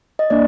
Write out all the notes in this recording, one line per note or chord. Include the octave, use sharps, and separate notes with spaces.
D#5
A#3 D4 D5